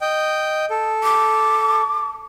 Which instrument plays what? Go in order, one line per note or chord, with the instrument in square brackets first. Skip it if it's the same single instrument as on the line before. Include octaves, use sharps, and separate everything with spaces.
[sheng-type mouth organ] D#5 G5
A4
[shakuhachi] D6